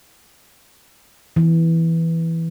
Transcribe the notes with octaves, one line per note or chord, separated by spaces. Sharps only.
E3